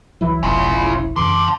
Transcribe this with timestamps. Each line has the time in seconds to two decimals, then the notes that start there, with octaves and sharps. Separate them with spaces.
0.21 C2 E3 F#3 E4
0.43 F1 B1 C#4 F4
1.16 F#2 C#3 E3 A5 C6 D6